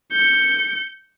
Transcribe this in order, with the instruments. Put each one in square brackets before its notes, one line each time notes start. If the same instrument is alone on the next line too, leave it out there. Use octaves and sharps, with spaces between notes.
[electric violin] G6 C#7